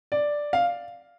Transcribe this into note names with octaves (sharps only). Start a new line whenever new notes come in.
D5
F5